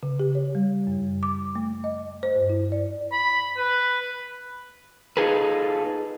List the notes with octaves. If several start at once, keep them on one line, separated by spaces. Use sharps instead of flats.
C#3
G4
C#5
G3
F#2
D6
A3
D#5
C5
G2
E4
D5
B5
B4
D#4 F4 G#4 A4 B4